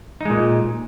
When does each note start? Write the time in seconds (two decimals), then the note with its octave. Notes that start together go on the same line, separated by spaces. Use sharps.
0.21 D#4
0.25 G#3
0.30 A#2